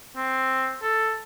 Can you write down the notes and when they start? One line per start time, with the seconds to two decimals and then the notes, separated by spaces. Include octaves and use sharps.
0.16 C4
0.82 A4